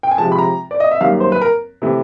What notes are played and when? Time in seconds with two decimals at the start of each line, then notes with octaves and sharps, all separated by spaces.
0.03 G5
0.11 G#5
0.18 C3 F3 G#3 A5
0.32 B5
0.39 A#5
0.71 D5
0.80 D#5
0.91 E5
1.01 F#2 D#3 G3 A#3 F5
1.20 C5
1.32 B4
1.41 A#4
1.82 C3 E3 A3